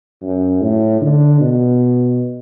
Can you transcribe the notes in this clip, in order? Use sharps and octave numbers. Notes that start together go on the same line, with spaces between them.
F#2
A2
D3
B2